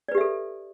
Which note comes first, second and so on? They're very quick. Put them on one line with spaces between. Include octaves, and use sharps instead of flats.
D5 B4 G4 E5 A4